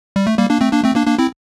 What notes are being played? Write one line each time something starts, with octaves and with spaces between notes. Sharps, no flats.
G3
A3
G3 A#3
A#3 D4
A3 C4
A#3 D4
A3 C4
A#3 D4
A#3 D4
C4 E4